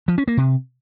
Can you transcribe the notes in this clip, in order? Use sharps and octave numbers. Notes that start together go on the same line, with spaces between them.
F3
C#4
A#3
C3